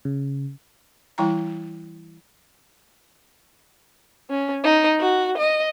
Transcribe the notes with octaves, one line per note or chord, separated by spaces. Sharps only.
C#3
E3 G3 E4 G5 A#5
C#4
D#4
F#4
D#5